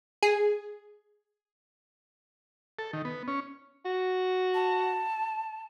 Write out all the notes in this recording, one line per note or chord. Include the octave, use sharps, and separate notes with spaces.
G#4
A4
D#3
B3
C#4
F#4
A5